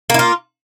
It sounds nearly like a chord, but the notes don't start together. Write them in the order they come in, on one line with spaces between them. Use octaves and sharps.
A#3 E4 F4